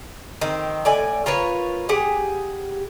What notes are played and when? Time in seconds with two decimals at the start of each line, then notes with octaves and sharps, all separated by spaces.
0.41 D#3 C4
0.85 A2 D5 G#5
1.26 F4 A#4 B4 C#5
1.89 G4 G#4 F#5